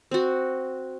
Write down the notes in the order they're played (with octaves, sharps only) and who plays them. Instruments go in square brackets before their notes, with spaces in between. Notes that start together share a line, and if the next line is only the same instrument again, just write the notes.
[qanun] C4 F#4